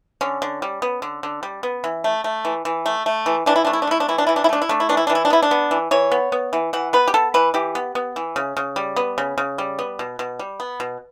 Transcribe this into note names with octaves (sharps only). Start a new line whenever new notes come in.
D3 C#4
D3
G3
B3
D3
D3
G3
B3
E3
A3
A3
E3
E3
A3
A3
E3
E3 D4
E4
A3 D4
E4
D4
A3 E4
D4
E3 E4
D4
E3 E4
D4
E4
A3 D4
E4
A3 D4
E4
E3 D4
E4
E3 D4
E4
D4
B3 E4
D4
B3
E3
E3 C#5
B3
B3
E3
E3 F#5
B3 B4
G4
B3 A4
E3 B4
E3 G4
B3
B3
E3
C#3
C#3
G3
B3
C#3
C#3
G3
B3
B2
B2
G3
B3
B2